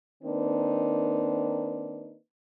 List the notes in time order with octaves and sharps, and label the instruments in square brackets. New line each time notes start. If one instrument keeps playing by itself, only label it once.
[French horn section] D#3 A#3 C4 D4 D#4 B4